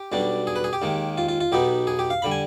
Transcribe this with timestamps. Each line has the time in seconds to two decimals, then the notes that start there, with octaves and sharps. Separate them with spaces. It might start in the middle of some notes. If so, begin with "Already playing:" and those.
Already playing: G4
0.12 B1 B2 G3 D4
0.47 G#4
0.56 B4
0.64 G#4
0.73 G4
0.82 D#2 D#3 G#3
1.18 F4
1.29 F4
1.41 F4
1.52 B1 B2 B3 D#4 G4
1.87 G#4
1.99 G4
2.10 F5
2.22 D3 G3 B5
2.31 G#5